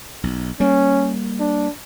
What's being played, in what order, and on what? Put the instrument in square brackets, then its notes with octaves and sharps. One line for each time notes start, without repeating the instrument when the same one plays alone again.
[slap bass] B1
[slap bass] G3 A#3 [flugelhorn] C#4
[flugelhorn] D4